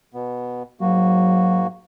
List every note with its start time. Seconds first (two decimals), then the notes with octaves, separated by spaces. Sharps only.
0.14 B2 B3
0.81 G#2 F#3 A#3 F#4